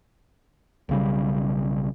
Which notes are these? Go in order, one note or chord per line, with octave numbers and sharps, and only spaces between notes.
B1 C#3 G3